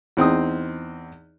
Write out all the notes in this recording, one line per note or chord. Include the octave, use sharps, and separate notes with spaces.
E2 C4 D#4 D#6